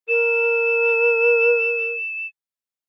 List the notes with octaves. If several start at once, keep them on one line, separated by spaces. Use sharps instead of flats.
A#4 E7